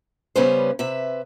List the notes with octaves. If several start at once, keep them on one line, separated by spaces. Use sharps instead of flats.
C#3 G3 B3 C#4 B4 C5
C3 B4 E5